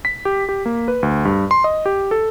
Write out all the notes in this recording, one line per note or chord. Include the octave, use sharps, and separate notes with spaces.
B6
G4
G4
A#3
B4
D2
G2
C6
D#5
G4
A4